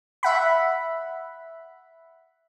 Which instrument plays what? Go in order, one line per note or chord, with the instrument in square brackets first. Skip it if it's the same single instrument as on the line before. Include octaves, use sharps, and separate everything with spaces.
[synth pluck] E5 F#5 B5